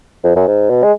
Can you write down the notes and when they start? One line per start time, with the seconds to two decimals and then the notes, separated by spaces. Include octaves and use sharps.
0.24 F2
0.36 F#2
0.47 G#2
0.70 B2
0.83 G#3